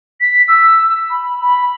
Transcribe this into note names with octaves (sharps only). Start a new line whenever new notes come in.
B6
E6
B5
B5